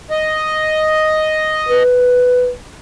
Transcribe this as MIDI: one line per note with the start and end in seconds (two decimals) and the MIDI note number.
0.10 1.83 75
1.69 2.49 71